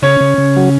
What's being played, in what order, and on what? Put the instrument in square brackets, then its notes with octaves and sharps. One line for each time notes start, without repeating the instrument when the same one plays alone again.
[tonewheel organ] C#3 [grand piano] C#4 C#5
[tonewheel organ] C#3
C#3
F#3